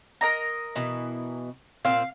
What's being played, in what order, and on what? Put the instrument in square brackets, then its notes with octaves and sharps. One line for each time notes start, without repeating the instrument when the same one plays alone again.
[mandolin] A#4 D#5 A#5
[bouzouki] B2 E3
[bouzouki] A#2 C4 [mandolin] F5